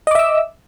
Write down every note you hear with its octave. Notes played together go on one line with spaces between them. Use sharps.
D#5 E5 D6 E6